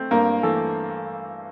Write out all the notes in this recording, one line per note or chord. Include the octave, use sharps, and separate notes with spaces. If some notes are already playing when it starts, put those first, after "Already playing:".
Already playing: A3 C4
G2 A#3 A#4
E3 A3 A4